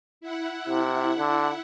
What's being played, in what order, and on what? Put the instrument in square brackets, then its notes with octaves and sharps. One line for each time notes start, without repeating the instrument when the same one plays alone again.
[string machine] E4 F#5
[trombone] C3
D3